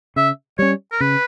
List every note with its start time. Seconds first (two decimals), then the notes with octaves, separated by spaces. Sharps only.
0.16 C#3 E5
0.59 G3 C#4 C#5
0.92 A#4
1.00 C#3 B4